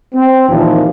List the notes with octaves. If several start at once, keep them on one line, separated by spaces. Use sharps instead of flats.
C4
D#2 A#2 E3 F3